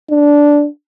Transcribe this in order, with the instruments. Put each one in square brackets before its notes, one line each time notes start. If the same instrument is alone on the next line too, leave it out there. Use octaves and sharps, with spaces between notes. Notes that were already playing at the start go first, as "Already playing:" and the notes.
[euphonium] D4